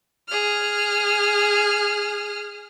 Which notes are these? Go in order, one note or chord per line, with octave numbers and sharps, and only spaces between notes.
G#4 F6